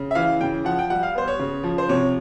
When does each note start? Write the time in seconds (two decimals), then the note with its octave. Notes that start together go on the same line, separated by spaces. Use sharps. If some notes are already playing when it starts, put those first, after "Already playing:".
Already playing: C#3
0.11 E5
0.15 E3 F5
0.41 C#3 G5
0.65 F3 F#5
0.79 G5
0.90 G3 F#5
1.03 F5
1.15 B3 C5
1.28 C#5
1.40 C#3
1.63 F3
1.78 C5
1.89 C3 C#5